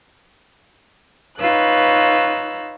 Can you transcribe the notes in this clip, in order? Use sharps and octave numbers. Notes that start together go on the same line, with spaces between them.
D#4 F4 B4 C#5 E6 F#6